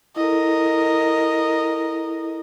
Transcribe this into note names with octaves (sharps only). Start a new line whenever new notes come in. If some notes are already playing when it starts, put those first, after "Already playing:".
E4 A4 A#4 D#5